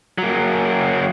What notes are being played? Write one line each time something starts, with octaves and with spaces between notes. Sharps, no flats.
F#3 A#3